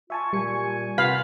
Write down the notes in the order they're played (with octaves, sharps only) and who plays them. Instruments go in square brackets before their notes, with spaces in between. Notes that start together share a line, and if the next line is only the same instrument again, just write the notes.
[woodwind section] F4 C#6 [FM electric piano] E5 G#5 A5
[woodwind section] A#2 G#5 [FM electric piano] G3 C#7
[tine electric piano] C3 B5 B6 [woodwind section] F4 [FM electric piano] B4 F#5 [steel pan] F5